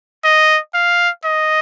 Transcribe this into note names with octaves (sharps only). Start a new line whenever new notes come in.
D#5
F5
D#5